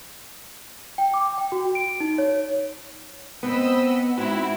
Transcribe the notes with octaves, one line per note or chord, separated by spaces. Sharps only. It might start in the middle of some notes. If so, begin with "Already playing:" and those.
G5
D6
G5
F#4
D7
D#4
C#5
B3 C4 B4 D#5 B5 E6
G#2 C4 E4 F#4